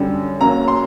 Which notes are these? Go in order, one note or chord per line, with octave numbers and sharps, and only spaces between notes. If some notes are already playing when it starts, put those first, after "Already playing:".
Already playing: F#2 D3 G3
F#1 F#2 F#3 A#3 A#5
C6